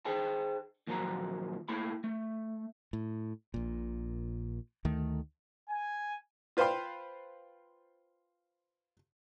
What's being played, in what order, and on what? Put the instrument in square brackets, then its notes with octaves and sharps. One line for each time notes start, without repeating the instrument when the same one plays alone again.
[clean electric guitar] G#4 C5 G5 A5
D#2 A#2 F3 F#3 A#5
A3 A#3 E4 B5
A3
[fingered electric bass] A2
A#1 A#2
D2 D#3 A3
[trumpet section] G#5
[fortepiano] F4 B4 C5 F5 G5 C6